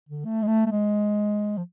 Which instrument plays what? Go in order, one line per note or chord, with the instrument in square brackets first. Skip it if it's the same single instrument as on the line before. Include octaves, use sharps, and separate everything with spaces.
[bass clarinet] D3
A3
G#3
A3
A3
G#3
F3